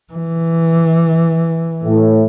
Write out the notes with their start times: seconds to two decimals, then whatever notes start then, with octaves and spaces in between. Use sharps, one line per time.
0.14 E3
1.84 A2